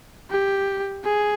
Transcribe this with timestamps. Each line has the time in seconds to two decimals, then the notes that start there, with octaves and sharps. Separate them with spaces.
0.30 G4
1.04 G#4